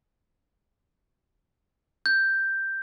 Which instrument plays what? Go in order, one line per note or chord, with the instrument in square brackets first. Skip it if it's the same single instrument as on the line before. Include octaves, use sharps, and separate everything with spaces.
[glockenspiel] G6